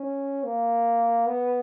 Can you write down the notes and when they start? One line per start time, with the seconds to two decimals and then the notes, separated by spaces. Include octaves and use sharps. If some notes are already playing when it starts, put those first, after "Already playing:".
Already playing: C#4
0.44 A#3
1.27 B3